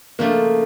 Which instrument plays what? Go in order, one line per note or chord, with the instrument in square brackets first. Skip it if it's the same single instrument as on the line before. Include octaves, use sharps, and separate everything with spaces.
[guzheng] C#3 F3 A3 D4 [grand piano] A#3